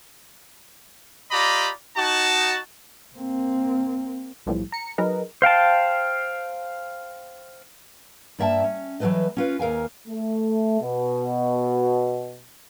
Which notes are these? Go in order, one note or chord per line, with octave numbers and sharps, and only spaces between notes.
F4 G4 D5 D#5 A#5 B5
D#4 F#4 A5
A#3 C4
B1 A2 E3 F3 G3
A#5 C#7
F#3 D#4 G#4 A#4 B4 D#5
C5 F5 G5 A5
G2 A#3 D5 E5 G5 A5
C#4
E3 F#3 G#3 A3 B4 D#5
C#4 F4 B4
D#2 A#4 F5 G#5
A3
B2